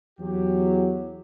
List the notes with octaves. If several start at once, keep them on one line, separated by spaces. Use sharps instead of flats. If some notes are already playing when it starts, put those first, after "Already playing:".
E2 F#3 G4